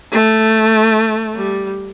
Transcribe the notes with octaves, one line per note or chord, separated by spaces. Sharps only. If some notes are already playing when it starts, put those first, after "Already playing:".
A3
G3